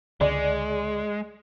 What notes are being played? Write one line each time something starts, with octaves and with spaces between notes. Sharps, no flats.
C#2 D3 G#3 D5